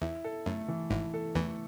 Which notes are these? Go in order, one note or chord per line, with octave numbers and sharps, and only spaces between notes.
E2 E4
A4
F#2 A3
E3
G#1 G#2 E4
A4
E2 E3 A3